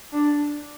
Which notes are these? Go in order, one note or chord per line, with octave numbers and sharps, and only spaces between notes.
D4